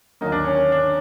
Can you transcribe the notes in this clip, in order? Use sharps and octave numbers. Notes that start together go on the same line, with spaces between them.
D#2 D3 F#3 A#3 D#4
D4
C#4
C#4
D4